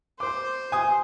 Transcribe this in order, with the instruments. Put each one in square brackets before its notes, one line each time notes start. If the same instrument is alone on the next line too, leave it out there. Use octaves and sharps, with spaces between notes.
[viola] C5 [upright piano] D6
[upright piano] G#5 D#6